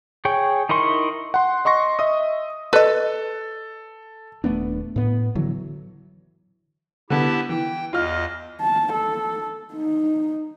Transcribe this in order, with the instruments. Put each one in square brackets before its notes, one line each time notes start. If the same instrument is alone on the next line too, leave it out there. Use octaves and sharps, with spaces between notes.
[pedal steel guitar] G#4 C#5 G5
D#4 E4 A#4 C6 C#6
[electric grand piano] F#5 C6
D#5 C6 C#6 A#6
D#5 E5 D#6
[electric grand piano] A4 [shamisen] B4 D#5
[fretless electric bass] D#1 A3 B3 D4
A2 B3
D3 E3 F#3
[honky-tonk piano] D3 B3 [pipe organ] E4 G4 A5
[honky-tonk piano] E3 [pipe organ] G5
[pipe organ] E2 D#5 [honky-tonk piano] F4 F6
[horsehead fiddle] A5
A4
D#4